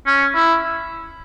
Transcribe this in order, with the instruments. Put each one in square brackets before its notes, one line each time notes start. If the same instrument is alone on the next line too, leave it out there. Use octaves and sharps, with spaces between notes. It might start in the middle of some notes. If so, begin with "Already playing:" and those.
[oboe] C#4
E4